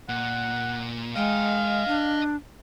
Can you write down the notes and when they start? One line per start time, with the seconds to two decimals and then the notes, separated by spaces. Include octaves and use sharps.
0.09 A#2 F#5
1.16 G#3 D#5 F5 G5
1.88 D4